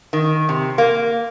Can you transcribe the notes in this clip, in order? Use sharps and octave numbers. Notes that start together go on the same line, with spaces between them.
D#3
C3
A#3